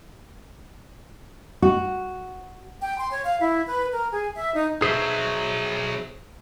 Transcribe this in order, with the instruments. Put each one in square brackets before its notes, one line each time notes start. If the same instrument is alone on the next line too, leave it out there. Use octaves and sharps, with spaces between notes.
[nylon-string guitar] F#4
[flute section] G5
C6
C#5
F5
E4
B4
A#4
G#4
E5
D#4
[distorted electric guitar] B1 F#3 [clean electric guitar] G#4 C5 E5